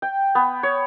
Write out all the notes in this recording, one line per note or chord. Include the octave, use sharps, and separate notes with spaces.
G5
B3
C#5